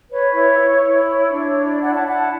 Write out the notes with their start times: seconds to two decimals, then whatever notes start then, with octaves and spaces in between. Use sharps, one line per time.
0.10 B4 C#5
0.34 E4 C#5
0.58 E4
0.83 E4
1.09 C#5
1.32 D4
1.57 E4
1.70 D5
1.82 E4 D5 F#5
1.95 F#5 A5
2.06 E4 F#5 A5